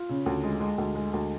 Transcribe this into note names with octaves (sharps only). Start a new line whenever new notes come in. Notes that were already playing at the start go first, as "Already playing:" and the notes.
Already playing: F4
C#3
D2
G#3
G#3
D2
G#3
D2